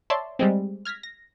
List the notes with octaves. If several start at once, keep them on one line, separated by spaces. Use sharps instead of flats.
C#5 D5 E5 A5 C6
G3 G#3 C4
F6 G#6 A#6 B6
A#6